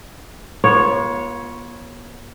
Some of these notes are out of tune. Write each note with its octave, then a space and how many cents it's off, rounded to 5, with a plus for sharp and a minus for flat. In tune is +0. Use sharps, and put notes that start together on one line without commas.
B3 -45 F4 +0 C#5 +0